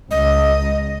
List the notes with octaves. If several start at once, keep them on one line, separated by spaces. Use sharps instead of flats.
C#2 D#5